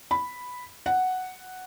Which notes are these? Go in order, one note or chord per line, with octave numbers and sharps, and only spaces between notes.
B5
F#5